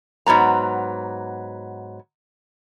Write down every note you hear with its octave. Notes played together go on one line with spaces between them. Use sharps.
G#2 F#3 B3 A#5